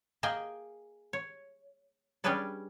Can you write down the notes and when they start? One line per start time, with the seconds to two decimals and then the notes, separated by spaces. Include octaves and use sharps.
0.23 A#3 G#4 D#5 G5 G#5
1.13 C#5
2.24 G3 C#4 D4 G#4 B4 D5